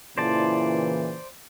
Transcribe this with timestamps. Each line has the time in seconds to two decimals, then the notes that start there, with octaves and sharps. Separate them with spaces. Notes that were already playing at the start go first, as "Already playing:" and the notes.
0.18 A#2 C#3 E3 C5 D5 A5